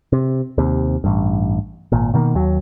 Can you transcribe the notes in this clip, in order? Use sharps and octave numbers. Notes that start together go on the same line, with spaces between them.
C3
D#2 C3
A1 G2
G#1 A#2
B2 D#3 A3 A#3
D#2 F#3